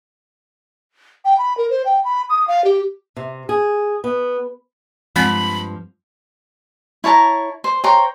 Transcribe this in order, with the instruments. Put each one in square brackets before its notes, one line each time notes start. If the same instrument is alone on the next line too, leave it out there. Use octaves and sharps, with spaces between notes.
[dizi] G5
B5
A#4
C5
G5
B5
D#6
F5
G4
[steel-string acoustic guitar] C3
G#4
B3
[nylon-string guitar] G2 F3 [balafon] G#3 C4 [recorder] B5
[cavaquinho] E4 C#5 A5 A#5
C5
C5 C#5 G5 A#5